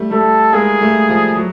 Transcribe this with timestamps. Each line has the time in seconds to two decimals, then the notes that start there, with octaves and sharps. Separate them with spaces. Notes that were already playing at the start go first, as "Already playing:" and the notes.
Already playing: G3 A3
0.11 G3 A3 A4
0.53 G#3 A#3 G#4
0.81 G3 A3
1.09 F3 G3
1.37 F#3